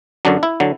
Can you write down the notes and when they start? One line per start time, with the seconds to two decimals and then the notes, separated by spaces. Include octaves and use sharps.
0.25 F#2 D3 F#3 D4
0.43 E4
0.60 D3 F#3